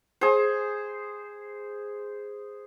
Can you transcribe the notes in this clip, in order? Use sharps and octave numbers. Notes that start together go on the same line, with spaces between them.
G#4 C5